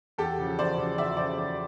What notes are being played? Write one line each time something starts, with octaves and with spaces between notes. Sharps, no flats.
E2 G4 A4
C#3 F3
E2 C5 D5
C#3 F3
E2 D5 E5
C#3 F3 C5 D5
E2